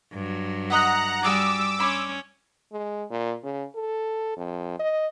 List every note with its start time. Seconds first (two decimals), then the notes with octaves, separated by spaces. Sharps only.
0.13 G2 F#3
0.70 D#5 E5 F#5 A#5 F#6
1.23 G3 F#4 G#4 D5 D6 E6
1.79 C#4 D5 B5 C6
2.72 G#3
3.10 A#2
3.43 C#3
3.75 A4
4.37 F2
4.79 D#5